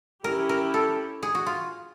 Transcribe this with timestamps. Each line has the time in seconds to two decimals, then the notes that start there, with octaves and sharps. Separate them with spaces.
0.24 C#4 E4 G4 A#4
0.49 A#4
0.74 A4
1.23 G#4
1.35 F#4
1.46 F4